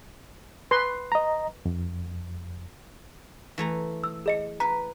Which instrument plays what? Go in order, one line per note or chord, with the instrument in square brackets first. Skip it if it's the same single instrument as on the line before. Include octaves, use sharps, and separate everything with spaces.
[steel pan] B4 C6
[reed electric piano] D#5 A#5
F2
[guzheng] E3 A3 A#5
[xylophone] E6
G#4 D#5 C#7
[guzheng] B4 [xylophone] A#5